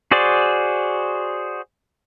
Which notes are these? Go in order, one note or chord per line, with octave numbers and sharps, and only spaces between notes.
F#4 G#4 C5 D5